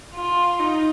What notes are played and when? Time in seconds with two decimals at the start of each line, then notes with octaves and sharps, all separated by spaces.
0.15 F4
0.59 D#4